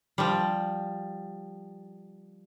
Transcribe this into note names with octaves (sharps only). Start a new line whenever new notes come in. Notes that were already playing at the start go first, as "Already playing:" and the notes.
F3 G3